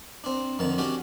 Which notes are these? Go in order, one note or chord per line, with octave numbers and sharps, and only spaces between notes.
C4 D4
F2 D3 D#3 A5
C#4 D4 F#4 G4 D5